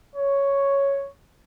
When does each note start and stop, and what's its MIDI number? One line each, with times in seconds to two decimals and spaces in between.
0.14 1.08 73